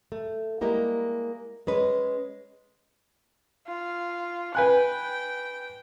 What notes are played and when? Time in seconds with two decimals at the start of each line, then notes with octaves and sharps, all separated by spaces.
0.12 A3
0.61 G3 G#3 A#3 E4 G4
1.67 G#3 C#4 B4
3.67 F4
4.55 B4 G5 G#5 F#6